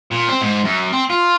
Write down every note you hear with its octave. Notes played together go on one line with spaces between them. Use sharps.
A#2
C4
G#2
F#2
C4
F4